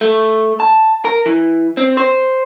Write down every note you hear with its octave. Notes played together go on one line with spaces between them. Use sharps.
A3
A5
A#4
E3
C4
C5